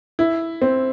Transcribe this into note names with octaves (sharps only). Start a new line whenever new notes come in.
E4
C4